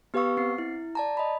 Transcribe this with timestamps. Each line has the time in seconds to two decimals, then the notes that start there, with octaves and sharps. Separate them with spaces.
0.14 B3 G4 B4 F5 C#6 E6
0.37 C4 C7
0.58 E4
0.95 D5 A5 A#5
1.17 D#5 B5